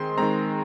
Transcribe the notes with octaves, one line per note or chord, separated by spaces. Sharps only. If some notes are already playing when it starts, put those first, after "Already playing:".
Already playing: D#3 G#3 C4 C6
D#3 G#3 C4 A#5